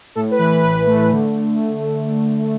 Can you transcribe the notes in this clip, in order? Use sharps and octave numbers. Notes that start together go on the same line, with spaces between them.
A2 A4
B4
E3
B4
A1 B4
A3
D3